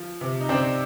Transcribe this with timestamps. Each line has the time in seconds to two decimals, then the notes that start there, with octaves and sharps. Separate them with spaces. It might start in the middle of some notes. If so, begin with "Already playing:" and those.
Already playing: F3
0.21 C3
0.40 D#4
0.49 C3 C4 D4